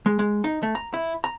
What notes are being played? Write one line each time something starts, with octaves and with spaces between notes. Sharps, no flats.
G#3
G#3
D#4
A3
A#5
E4
A#5